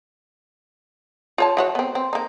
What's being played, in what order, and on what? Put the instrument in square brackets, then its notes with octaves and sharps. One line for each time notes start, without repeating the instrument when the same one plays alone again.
[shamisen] F4 C#5 A5
E3 F#4 C#5
B3 C4
C4
A#3 D#4